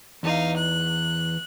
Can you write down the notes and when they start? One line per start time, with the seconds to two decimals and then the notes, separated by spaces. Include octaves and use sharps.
0.23 E2 D#4 F5
0.56 F#6